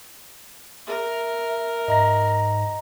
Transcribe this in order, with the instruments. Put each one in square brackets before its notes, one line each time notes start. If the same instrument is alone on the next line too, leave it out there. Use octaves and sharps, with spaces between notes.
[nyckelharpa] A#4 [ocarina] E5
[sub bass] G#2 [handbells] D#5 A#5 A#6